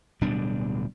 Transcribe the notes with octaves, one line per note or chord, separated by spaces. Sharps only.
D1 B2 G3 D4